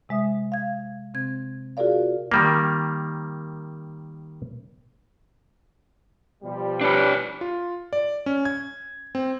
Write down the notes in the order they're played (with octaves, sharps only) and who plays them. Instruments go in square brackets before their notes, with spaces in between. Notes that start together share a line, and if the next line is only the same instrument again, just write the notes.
[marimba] C3 G#3 E5 D#6
F5 G#6
C3 C4 G#6
F4 F#4 G#4 A#4 D5 F5
[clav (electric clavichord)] D#3 G3 A#3
[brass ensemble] B2 F3 G3
[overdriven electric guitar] D4 C#5 [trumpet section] G4 B4
[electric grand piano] F4
D5
C#4
G#6
C4